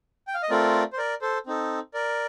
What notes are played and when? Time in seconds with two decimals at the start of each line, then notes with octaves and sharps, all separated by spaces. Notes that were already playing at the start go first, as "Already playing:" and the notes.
0.27 G5
0.34 F5
0.43 D#5
0.50 A3 C4 F4 A4 A#4 D5
0.93 C5
0.98 A#4 D5
1.22 A4 C5
1.46 C4 D#4 A4
1.94 A#4 D5